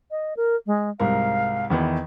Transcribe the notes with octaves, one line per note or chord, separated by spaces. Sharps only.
D#5
A#4
G#3
C2 G#2 A#4 F5
E2 D#3 E3